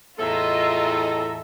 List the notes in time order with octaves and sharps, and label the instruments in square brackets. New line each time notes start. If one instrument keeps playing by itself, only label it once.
[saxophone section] E2 A2 A4 [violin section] F4 D#5 [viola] E5 A#5